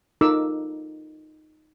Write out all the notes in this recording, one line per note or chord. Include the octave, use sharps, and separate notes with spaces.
D#4 F4 A4 A#4 D6 E6